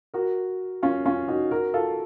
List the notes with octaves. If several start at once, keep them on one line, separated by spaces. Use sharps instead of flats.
F#4 A#4
C#4 F4
C#4 F4
D#4 F#4
F#4 A#4
F4 A4